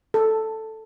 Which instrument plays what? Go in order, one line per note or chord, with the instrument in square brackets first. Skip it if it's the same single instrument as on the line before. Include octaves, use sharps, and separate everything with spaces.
[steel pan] A4